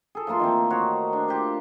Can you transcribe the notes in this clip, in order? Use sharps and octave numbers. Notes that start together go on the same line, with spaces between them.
G#4 A4
F3 A3 A#3 C6
D#3 E3 C4
D#4 F#4 C5 C#5
D4
F4 G4 C5